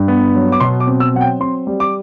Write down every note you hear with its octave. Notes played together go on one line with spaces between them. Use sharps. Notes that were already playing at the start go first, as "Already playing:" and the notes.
Already playing: G2
B3
F#3
D6
B2 C6
D6
C4
E6
F#3 F#5
G5
C4 C6
G3
D6